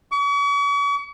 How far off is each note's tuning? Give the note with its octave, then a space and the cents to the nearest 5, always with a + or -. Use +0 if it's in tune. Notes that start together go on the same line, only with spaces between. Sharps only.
C#6 +45